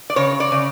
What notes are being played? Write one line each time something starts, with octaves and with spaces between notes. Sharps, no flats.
D5
C#3 C#5
D5
C#3